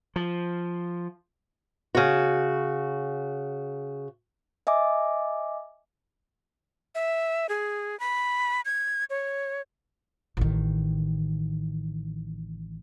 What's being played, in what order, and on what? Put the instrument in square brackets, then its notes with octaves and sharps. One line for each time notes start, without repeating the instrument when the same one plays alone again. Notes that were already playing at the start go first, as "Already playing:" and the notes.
[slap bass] F3
[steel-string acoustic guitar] C#3 F#4
[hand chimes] D#5 E5 G#5 D6
[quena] E5
G#4
B5
G#6
C#5
[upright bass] A1 D#3